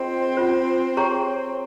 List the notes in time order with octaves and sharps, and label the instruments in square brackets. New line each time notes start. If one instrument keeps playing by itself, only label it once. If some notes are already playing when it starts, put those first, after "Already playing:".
Already playing: [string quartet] C4 [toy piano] F4 G#4 D#5 G5 C6
[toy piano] C#4 F4 C5
G#4 C#5 G5 A#5 C#6